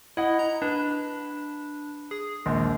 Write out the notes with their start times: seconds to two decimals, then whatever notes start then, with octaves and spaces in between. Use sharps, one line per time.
0.17 E4 D#5 F#5
0.39 A#5
0.62 D4 B4
2.11 G#4
2.46 A#1 D#2 G#3